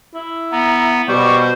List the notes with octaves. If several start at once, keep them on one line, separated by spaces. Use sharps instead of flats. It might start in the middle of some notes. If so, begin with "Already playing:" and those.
E4
B3 A#5
B2 G3 C5 C#6